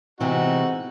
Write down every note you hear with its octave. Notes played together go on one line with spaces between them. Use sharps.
C3 E3 G#3 B3 C4 D#4 F#4